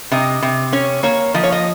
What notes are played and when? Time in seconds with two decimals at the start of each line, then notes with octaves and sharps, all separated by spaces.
0.11 C3 D#5
0.42 C3
0.72 C#4 C#5
1.03 A#3 C#5
1.34 F3 D#5
1.43 C#5
1.52 D#5